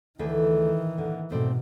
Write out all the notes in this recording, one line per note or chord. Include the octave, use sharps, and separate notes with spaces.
D2 D#3 E3 A3 G#4
A#2 D3
G#2 B2 A3 C4 D5